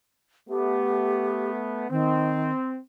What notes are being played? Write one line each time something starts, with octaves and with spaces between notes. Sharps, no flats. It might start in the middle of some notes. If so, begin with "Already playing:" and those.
A3 B3 G4
D#3 C4